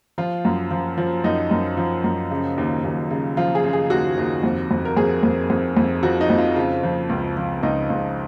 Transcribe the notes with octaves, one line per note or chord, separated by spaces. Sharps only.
F3 F4
F#2
F3
F3
F#2 D#4
F#2
F3
F#2
C#3
D#2
D#2
C#3
F3 F4
G#4
C#3
G#4
D#2 F#4
D#2
F2
F2
A#4
F2 G#4
F2
F2
F2
F3 F#4
D#4
F2
F4
C#3 F4
F3
C#2
F3
C#2 D#4
C#2